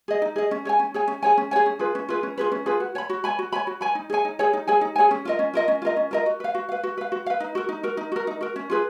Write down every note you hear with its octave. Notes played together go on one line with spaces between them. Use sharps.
G#4 D#5
D#4
G#4 D#5
C#4
G#4 C#5 G#5
C#4
G#4 C#5 G#5
C#4
G#4 C#5 G#5
C#4
G#4 C#5 G#5
C#4
F4 G#4 B4
C#4
F4 G#4 B4
C#4
F4 G#4 B4
C#4
F4 G#4 B4
F#4
C#5 G#5 B5
F#4
C#5 G#5 B5
F#4
C#5 G#5 B5
F#4
C#5 G#5 B5
D#4
G#4 C#5 G#5
D#4
G#4 C#5 G#5
D#4
G#4 C#5 G#5
D#4
G#4 C#5 G#5
C#4
F4 A#4 D#5
C#4
F4 A#4 D#5
C#4
F4 A#4 D#5
C#4
F4 A#4 D#5
F#4
B4 F5
F#4
B4 F5
F#4
B4 F5
F#4
B4 F5
D#4
F#4 A#4
D#4
F#4 A#4
D#4
F#4 A#4
D#4
F#4 A#4
C#4
F4 G#4 B4